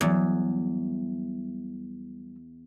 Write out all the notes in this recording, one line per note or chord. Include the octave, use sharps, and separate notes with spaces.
E2 F#3 G3